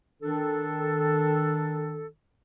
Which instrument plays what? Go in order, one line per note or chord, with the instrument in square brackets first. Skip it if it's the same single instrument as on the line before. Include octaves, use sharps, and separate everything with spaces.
[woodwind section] D#3 D4 A4